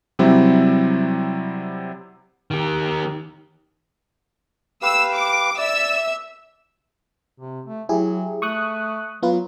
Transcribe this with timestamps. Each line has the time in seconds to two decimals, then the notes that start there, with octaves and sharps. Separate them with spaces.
0.19 C3 F#3 G3 C4 E4
2.51 D#3 G4
4.82 G4 B4 F5 E6
5.15 D6
5.58 D5 E5 E6
7.40 C3
7.66 A3
7.89 F#3 E4 G4 G#4
8.42 A3 C#6 D#6 F#6
9.23 F#3 B3 F4 B4